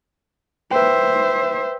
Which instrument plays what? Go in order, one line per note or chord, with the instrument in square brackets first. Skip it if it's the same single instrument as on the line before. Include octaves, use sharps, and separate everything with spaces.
[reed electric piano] B4 G5 [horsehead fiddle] C5 E5